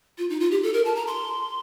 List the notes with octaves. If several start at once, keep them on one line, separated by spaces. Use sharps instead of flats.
F4
D#4
F4
G4
A4
A#4
A5
A#5
C6